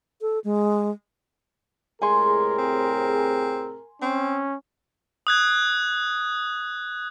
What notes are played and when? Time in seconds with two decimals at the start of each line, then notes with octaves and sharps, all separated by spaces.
0.21 A4
0.44 G#3
2.02 A2 C3 G#3 G#4 A#4 G#5 C6
2.58 C4
4.02 C4 C#4
5.27 D#6 F#6 G#6